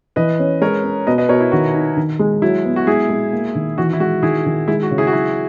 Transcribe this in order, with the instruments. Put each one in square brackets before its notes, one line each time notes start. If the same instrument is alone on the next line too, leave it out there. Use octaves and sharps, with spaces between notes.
[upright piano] E3 [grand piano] B4 D#5
[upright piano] C#4
[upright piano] G#3 [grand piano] A#4 C#5
[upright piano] C#4
[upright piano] B2 [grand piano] B4 D#5
[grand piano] B4 D#5
[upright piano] B2 [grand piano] A#4 C#5
[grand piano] E4
[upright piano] D#3 [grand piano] F#4
[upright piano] D#4
D#3
G#3
[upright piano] F#3 [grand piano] E4
[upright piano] B3
[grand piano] F#4
[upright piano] G#3 [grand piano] E4 G#4
[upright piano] G#3
A#3
D#3
[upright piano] E3 [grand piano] F#4
[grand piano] E4
[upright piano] G#3 [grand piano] F#4
[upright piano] D#3 [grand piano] E4 G#4
[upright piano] D#3
[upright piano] G#3 [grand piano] E4
[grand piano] F#4
[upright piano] C#3
[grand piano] E4 G#4
F#4
[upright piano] F#3 [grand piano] E4